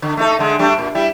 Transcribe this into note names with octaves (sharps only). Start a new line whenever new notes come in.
D3
A3 D#4 A4
D3 G#3
G3 A3 D4
A#2
G3 E4